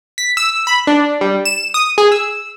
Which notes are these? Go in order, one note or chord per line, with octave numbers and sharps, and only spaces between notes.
B6
E6
B5
D4
G3
E7
D#6
G#4
E6